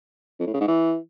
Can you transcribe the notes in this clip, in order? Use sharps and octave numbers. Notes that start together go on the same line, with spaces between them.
F2
A2
C#3
G#2
E3